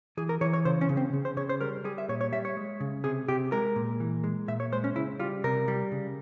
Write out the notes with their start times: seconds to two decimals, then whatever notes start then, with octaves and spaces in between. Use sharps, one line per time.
0.17 E3 G#4
0.29 A#4
0.41 E3 C#5
0.53 C#5
0.65 C#3 C5
0.81 C#4
0.89 C#3
0.97 C4
1.13 C#3
1.25 C5
1.37 C#3 C#5
1.49 C5
1.61 G3 A#4
1.84 G3 G#4
1.98 E5
2.09 A#2 C#5
2.21 C#5
2.33 G3 E5
2.45 C#5
2.57 G#3
2.80 C#3
3.04 C3 G#4
3.28 C3 G4
3.52 G#3 A#4
3.76 A#2
4.00 E3
4.24 G#3
4.48 A#2 E5
4.60 C#5
4.72 G#3 C5
4.84 C#4
4.96 C#3 E4
5.20 G3 F4
5.44 C3 A#4
5.68 G3
5.92 C#3